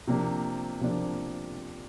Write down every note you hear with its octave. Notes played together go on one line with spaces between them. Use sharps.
C3 F3 A#3 D4
C3 F3 A#3 D4